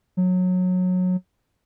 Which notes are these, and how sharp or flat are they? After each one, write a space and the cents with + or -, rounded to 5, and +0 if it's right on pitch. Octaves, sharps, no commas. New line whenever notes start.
F#3 -20